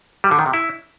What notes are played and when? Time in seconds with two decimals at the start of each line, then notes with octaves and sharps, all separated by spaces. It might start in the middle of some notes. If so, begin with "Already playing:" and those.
0.24 G3
0.31 D3
0.39 D#3
0.46 C3
0.53 E4